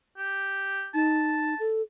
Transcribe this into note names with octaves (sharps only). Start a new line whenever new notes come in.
G4
D#4 A5
A4